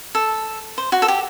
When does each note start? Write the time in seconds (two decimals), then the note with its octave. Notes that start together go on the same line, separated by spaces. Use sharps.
0.15 A4
0.78 C5
0.92 F#4
1.02 A4
1.08 G4